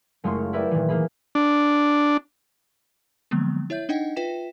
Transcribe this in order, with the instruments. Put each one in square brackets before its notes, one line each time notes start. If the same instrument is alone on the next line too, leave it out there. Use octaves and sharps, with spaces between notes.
[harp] F#1 G#3 A3 F4 C#5 C6
E4 G4 A#4 B4 D5 E5
A#2 D#3 E3
E3 A#3 G#4 B5
[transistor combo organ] D4
[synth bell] D3 F3 F#3 G#3 A#3 B3
E4 C#5 E5 G6
D4 D#4 D#5 F#5 G5
F4 B4 E5 G5 B6 E7